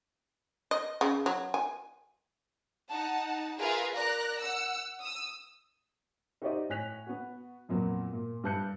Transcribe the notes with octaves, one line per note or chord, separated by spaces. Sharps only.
D#5
C#3
F#3
G#5
D#4 F#5 A5
F4 G#4 A#4 B4 E5 F5
A#4 D5 A#5 F#6 A#6
F#5 E6
D#6 E6
D#4 F#4 G4 C5 D5 D#5
A2 C#5 G#5 F#6 B6 F7
B3 F#4
F2 A#2 F#3 B3
A#2
G2 B4 A5 F#6 G6 C#7